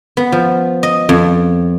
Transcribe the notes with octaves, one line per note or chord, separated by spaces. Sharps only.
B3
F3
D#5
F2